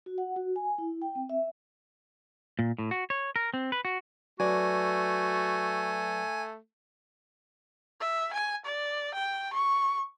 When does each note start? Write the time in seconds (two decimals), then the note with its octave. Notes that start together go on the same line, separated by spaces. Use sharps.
0.06 F#4
0.18 F#5
0.36 F#4
0.56 G#5
0.78 E4
1.02 G5
1.15 C4
1.29 E5
2.59 A#2
2.78 A2
2.91 F#4
3.10 C#5
3.36 A#4
3.54 C4
3.72 B4
3.85 F#4
4.40 F#3 A3 F#4 B4 D5 G#5
8.00 E5
8.33 G#5
8.65 D5
9.14 G5
9.53 C#6